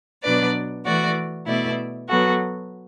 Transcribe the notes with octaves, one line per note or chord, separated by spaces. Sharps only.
B2 F#3 D4 B4 D5
E3 A3 F#4 D5
B2 A3 E4 D5
F#3 B3 F#4 A4